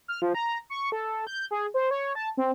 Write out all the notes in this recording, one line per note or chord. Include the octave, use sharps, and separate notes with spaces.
F6
F3
A#5
C#6
A4
G6
G#4
C5
C#5
A5
C4